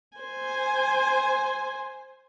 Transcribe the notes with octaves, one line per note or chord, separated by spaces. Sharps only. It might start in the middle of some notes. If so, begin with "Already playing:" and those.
C5 G#5